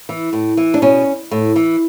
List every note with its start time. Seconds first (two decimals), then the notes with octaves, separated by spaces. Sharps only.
0.09 E3
0.33 A2
0.57 E3
0.74 D4
0.82 B2 C#4
1.31 A2
1.56 E3